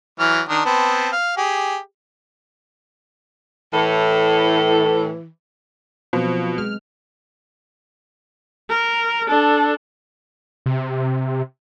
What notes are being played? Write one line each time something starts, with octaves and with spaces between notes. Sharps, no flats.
E3 F#3 F6
D#3 D4
B3 C4 A5
F5
G4 G#4
A2 E3 A4
B2 F3 F#3 C4 B4
G#3 F6
A#4
D4 A4
C3